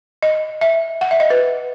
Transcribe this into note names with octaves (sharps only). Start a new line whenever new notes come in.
D#5
E5
F#5
E5
D#5
B4